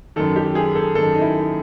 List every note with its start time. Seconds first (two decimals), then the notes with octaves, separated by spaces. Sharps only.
0.16 F#2 D#3 A4
0.36 G4
0.55 G#4
0.75 A4
0.95 F#2 D#3 A4
1.15 D#4
1.22 E4